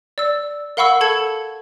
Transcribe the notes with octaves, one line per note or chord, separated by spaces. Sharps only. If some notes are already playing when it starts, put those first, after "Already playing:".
D5 E6
A#4 F5 F#5 B5 C#6 E6
A4 A5 G#6 C#7